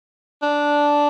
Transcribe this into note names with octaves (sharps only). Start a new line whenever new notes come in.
D4